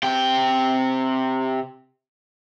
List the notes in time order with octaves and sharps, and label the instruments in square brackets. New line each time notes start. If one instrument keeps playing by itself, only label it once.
[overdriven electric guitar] C3 G5